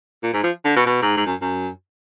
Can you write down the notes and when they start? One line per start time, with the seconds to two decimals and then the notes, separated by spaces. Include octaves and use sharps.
0.23 A#2
0.33 G#2
0.43 F3
0.65 D3
0.76 B2
0.86 B2
1.02 G#2
1.17 G#2
1.26 F#2
1.41 F#2